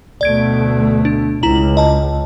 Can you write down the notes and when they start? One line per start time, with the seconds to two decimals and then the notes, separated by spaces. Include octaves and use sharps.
0.21 D2 B2 A3 D5 G#6 D7
1.05 D4
1.43 C#2 E4 A#5 F#7
1.77 D#5 A5